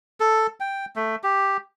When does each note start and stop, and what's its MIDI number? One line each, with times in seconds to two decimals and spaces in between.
0.20 0.47 69
0.60 0.85 79
0.96 1.16 57
1.23 1.57 67